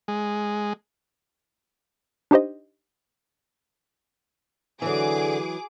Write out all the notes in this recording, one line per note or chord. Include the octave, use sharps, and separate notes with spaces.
G#3
D4 D#4 G4 C5 D#5
D3 E3 F#3 G#4 D6